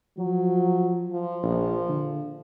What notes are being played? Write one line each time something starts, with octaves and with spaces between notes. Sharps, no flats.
F3 F#3
F3
A#1
D3